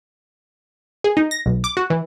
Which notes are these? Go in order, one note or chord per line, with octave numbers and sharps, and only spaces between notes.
G#4
D#4
A#6
B1
D6
F#4
E3